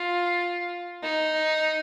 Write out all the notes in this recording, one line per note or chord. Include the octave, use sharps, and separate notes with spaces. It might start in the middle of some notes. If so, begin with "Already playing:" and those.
Already playing: F4
D#4